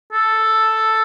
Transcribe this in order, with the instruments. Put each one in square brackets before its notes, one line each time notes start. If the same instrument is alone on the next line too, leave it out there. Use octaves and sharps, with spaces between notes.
[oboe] A4